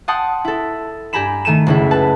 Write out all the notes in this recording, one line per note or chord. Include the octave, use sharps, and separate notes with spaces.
F#5 G5 A5 C6 D#6
E4 A4
G2 G4 G#5 A#5 B5 E7
D#3 A3 D#7 E7
F#1 C#2 E4
B4 A5